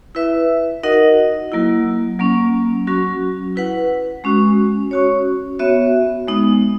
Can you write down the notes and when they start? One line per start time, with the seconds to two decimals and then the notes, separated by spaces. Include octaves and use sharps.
0.15 E4 B4 E5
0.83 D#4 F#4 A#4 D#5 F#5
1.52 F#3 A#3 E4
2.19 F#3 A#3 C#4
2.87 F#3 C#4 F#4
3.56 E4 B4 F#5
4.24 G#3 C#4 F#4
4.91 C#4 F#4 C#5
5.59 B3 F#4 C#5 E5
6.27 G#3 B3 D#4